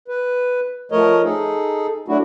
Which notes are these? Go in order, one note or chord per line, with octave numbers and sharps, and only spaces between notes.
B4
F3 A3 A#4 C#5 D#5
D#4 G#4 A4
F#3 A3 D4 E4 F#4